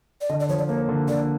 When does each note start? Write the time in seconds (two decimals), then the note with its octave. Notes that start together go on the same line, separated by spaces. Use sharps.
0.21 D5
0.29 D3 D#5
0.40 D5
0.49 F3 C#5
0.59 D5
0.68 A#3 C#5
0.88 D3
1.08 D3 D5